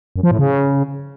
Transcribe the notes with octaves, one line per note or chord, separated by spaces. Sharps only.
F#2
F3
A2
C#3